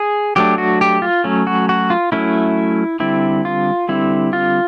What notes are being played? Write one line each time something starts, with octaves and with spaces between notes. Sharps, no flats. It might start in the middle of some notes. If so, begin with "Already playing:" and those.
Already playing: G#4
F#3 A3 D4 G4
F#4
G4
F4
F#3 A3 C#4
F#4
F#4
F4
F#3 A3 C#4 E4
D3 G3 C4 E4
F4
D3 G3 C4 E4
F4